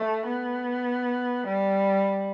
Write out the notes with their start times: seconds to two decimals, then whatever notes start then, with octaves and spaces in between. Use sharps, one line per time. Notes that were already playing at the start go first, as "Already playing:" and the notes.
Already playing: A3
0.27 B3
1.46 G3